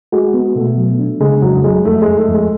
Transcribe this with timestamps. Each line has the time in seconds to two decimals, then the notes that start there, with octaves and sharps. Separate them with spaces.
0.12 G#3 F#4
0.34 B3
0.56 B2 A3
0.77 F#3
0.99 D4
1.20 C#3 G#3
1.42 F2 F#3
1.64 F#3 G#3
1.85 F2 A3
2.02 G#3
2.07 F2
2.18 A3
2.28 F2
2.34 G#3